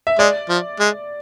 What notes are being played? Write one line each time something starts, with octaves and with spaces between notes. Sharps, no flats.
E5
G#3 D5
F3
G#3